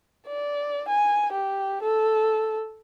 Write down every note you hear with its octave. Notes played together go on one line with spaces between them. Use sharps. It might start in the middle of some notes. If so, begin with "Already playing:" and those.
D5
G#5
G4
A4